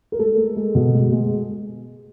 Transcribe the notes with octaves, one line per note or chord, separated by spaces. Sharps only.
A#4
G#3 A4
G#3
G#3
B2
G#3
G#3